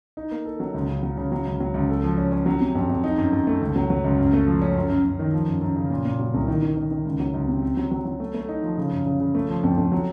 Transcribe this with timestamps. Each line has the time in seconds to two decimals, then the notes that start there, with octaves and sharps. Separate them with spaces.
0.17 D#4
0.31 A#3
0.45 A4
0.60 F#3
0.74 C#2
0.88 C#3
1.03 F#3
1.17 C#3
1.32 F#3
1.46 C#2
1.60 F#3
1.74 C#2
1.89 A4
2.03 F3
2.18 C#4
2.32 C#4
2.46 F#3
2.61 C3
2.75 F2
2.89 F2
3.04 D#4
3.18 F#2
3.33 F#2
3.47 A3
3.61 C#2
3.76 F#3
3.90 F#3
4.04 C#2
4.19 F#2
4.33 A3
4.47 F3
4.62 C#4
4.76 F#2
4.90 F#2
5.05 F#2
5.19 D#3
5.33 F3
5.47 F#2
5.61 F#2
5.76 C#3
5.90 A#2
6.05 A#2
6.19 F#3
6.34 C2
6.48 D#3
6.62 D#3
6.77 D#3
6.91 D#3
7.05 C#2
7.20 F#3
7.34 C#2
7.48 C3
7.62 C4
7.77 F#3
7.91 F#3
8.05 F#3
8.20 A3
8.34 A3
8.49 D#4
8.63 F3
8.78 C#3
8.92 F#2
9.06 C#3
9.20 C#3
9.35 A3
9.49 F3
9.63 F2
9.78 F2
9.92 F#3